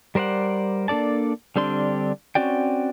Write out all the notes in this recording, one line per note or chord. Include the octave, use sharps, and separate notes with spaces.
G3 A#4 C5 D5 F#5
A#3 D4 A4 D5 A5
D3 G3 C4 D4 C6
C4 C#4 F#4 D5 G5